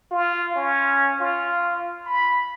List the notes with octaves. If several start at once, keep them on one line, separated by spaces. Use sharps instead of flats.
F4
C#4
F4
B5